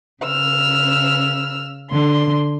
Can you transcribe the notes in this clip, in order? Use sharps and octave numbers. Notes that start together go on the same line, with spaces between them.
C#3 E6 F6
D3 C6